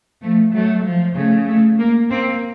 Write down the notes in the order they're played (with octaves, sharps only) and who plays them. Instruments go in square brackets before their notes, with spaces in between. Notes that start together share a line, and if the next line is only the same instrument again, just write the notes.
[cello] F3 [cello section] A3
[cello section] F#3 [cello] A3
[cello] F3
[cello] C#3 [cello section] A3
[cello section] A3
A#3
[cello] A#3 [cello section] C4